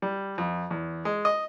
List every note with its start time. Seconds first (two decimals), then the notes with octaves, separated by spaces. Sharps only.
0.02 G3
0.38 F2
0.71 E2
1.05 G#3
1.25 D#5